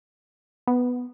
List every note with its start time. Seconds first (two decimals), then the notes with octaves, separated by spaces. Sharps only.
0.67 B3